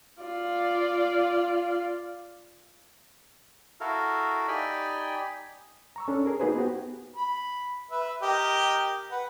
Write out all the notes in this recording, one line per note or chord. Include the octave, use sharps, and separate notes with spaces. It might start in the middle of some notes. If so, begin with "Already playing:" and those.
F4 D5
E4 F#4 A4 A#4 F5
D#4 G4 D5 G5 G#5 B5
A#5 C#6 E6
C#4 D4 A4
G#4 A#4
A#3 D#4 F#4 G#4 B4 C5
B3 F#4 G4
B5
B4 E5
G4 A#4 D#5
B4 F#5